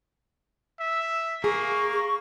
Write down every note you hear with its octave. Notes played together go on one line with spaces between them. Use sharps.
E5
A#3 G#4 C#6